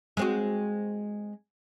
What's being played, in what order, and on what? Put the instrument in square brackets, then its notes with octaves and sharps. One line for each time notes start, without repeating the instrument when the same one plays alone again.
[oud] G#3 C4 F#4